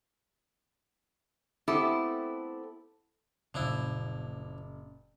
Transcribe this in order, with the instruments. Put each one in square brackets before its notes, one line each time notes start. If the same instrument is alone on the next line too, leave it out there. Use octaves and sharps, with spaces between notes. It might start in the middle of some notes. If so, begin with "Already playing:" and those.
[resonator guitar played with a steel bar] A3 B3 C4 E4 G4 A4
[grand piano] F#1 [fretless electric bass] A#2 C#3 [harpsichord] F3 D4 E4 [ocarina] C#4